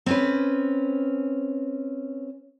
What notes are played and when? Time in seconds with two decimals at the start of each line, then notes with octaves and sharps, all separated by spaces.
0.06 C4 C#4 B4